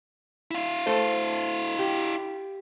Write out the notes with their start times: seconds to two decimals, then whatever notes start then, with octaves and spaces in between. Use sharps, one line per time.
0.51 E4 F5
0.86 A3 A4 C5
1.79 G4